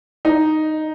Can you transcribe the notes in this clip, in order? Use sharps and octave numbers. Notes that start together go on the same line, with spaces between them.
D#4